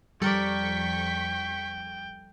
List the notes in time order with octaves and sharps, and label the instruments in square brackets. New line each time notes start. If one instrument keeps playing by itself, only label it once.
[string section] F2 C#6 B6 [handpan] G3 [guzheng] A4 A#4 D5 [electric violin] G5